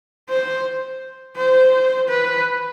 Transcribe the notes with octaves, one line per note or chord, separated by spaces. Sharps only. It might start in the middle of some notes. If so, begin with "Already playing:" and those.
C5
C5
B4